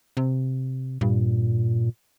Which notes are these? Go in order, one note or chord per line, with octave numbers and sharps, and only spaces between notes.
C3
G2 A#2